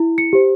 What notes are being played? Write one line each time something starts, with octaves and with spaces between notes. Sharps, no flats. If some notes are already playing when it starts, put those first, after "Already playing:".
Already playing: E4
C#7
G4 C5